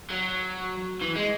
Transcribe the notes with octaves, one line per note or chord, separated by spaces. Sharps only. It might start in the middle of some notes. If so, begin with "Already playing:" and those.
F#3
E3
G#3